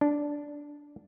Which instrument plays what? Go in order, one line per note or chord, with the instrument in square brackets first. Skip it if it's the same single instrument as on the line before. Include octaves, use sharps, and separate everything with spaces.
[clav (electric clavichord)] D4